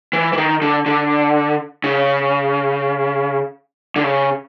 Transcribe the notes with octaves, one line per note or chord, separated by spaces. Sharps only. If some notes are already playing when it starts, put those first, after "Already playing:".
E3
E3
D#3
D3
D3
C#3
D3
C#3